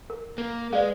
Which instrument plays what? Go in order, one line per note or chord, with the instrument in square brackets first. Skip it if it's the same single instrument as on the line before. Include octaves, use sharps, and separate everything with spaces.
[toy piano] A#4
[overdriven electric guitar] A#3
[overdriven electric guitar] G#3 [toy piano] B4 D5 F5